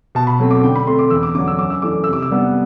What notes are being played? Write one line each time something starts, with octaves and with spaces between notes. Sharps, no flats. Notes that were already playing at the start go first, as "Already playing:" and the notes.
B2 A5
B5
F#3 A3 C4
D6
D3 G5
B5
A3 C4 C6
D6
E2 E6
D6
D3 F#3 D6
E6
F#2 D6
E6
E3 A3 D4 D6
C3 E6
D6
E6
G3 B3 D4